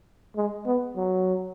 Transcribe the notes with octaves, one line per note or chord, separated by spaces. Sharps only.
G#3
B3
F#3